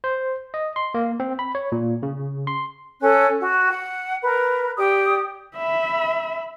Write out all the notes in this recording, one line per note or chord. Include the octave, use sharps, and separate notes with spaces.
C5
D#5
C6
A#3
C4
B5
C#5
A#2
C#3
C6
C#4 A4 F#6
F#4
F#5
A#4 B4
G4 D5 D#6
E5 B5